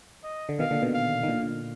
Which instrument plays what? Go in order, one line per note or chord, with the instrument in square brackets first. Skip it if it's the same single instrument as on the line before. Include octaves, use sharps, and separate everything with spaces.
[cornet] D#5
[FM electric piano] D3
[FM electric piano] B2 D#3 [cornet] F5
[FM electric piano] A#2 D3
B2 D#3
[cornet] F5
[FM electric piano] D#3
A#2 D3